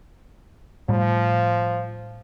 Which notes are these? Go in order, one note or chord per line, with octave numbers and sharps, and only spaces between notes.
A2 F3 G3